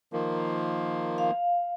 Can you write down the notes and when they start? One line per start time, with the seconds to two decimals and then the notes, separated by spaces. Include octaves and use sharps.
0.13 D#3 F3 A#3
1.18 F5